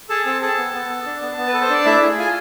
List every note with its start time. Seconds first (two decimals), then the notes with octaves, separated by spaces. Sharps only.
0.09 G#4 A4 A5
0.26 C4 A4 A5
0.42 G#4 A4 A5
0.58 B3
0.74 B3
0.89 A4
1.06 D4
1.22 B3
1.38 B3
1.48 B4
1.54 A4
1.61 C5
1.70 D4 D5
1.86 A3 E4 E5
2.02 G#4
2.18 F4 G#5